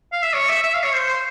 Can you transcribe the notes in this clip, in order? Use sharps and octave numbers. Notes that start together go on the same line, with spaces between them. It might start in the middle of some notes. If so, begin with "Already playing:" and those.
F5
E5
C#5
E5
E5
F5
C#5
C5
C5